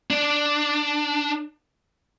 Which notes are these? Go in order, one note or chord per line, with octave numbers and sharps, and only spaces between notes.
D4